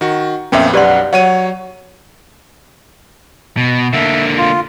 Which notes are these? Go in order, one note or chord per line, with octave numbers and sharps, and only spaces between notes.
D#3 F#4
F2 A#2 B3 C#4 E5 G5 G#5
B1 F#2 G4 B4 D5 F#5 C6
F#3 C#5 F#5 D#7
B2
D3 A#3 E5
F4